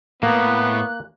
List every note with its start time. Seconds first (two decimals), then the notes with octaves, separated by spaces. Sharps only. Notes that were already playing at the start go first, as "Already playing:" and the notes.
0.23 A2 A#3 B3 F#6